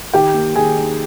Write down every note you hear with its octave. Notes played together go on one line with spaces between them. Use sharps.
D#3 G4 G5
A#3
D#3 G#4 G#5
D#4